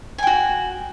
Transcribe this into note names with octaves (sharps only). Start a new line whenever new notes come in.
F#4 G5 G#5